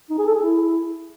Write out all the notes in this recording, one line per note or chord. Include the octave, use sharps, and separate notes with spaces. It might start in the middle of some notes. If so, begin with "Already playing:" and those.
D#4
G#4
A4
G#4
E4